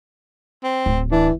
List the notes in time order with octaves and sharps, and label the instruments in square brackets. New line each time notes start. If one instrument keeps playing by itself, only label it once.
[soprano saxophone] C4
[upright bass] D1
[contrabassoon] E3 [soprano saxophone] D4